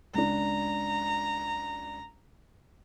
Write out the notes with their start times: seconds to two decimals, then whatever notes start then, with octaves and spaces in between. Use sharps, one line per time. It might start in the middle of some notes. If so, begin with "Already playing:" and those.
0.14 C#2 D4 A#5